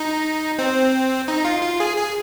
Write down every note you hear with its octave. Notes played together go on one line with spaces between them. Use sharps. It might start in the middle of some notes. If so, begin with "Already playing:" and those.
Already playing: D#4
C4
D#4
F4
F4
G#4
G#4